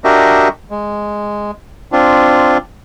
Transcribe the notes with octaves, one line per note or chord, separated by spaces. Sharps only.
D4 F#4 G4 A#4 D#5 E5
G#3
C4 D4 F4